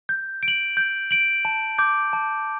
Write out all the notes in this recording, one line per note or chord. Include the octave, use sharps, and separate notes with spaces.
G6
D7
F#7
G6
D7 F#7
A5
D6 G6
A5